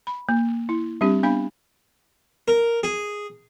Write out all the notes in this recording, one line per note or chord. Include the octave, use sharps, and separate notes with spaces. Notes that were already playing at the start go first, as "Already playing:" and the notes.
B5
A#3
E4
G3 C4 D4 G4
B3 D4 F5 B5
A#4
G#4